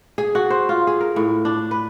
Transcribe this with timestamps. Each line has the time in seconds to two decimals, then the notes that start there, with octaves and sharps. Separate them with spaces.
0.18 G#4
0.35 F#4
0.50 C5
0.69 F4
0.87 G#4
1.01 A#4
1.16 A2
1.45 D4
1.71 B4